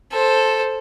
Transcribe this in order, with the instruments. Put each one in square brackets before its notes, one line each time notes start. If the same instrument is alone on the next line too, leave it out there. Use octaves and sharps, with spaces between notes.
[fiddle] A4 C5